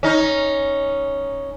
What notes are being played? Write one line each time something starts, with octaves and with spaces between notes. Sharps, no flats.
C#4 D#4